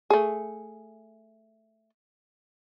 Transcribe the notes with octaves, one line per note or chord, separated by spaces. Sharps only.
A3 G#4